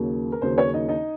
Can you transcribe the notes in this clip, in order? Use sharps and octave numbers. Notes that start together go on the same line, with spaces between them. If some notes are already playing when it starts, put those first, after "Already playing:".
Already playing: D#2 C#3 F#3 A#3
A#4
D#2 C#3 F#3 A#3 C5
C#4 C#5
D#4 D#5
D#4 D#5